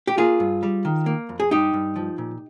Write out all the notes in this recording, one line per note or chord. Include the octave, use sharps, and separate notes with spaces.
G4
A#3 F4 G#4
G2
G3
D#3
A#3
F2
G#4
G2 D#4 G4
G2
F3
A#2